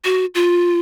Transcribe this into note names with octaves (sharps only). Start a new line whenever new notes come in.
F#4
F4